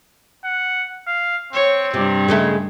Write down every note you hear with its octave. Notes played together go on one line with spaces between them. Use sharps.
F#5
F5
C4 C#5
G2 C3
C#3 G#3 A3